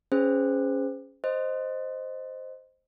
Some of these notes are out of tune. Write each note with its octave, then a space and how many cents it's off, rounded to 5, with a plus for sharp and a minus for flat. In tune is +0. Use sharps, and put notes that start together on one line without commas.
C#4 +0 G#4 +0 C5 -30
C5 +0 D#5 -5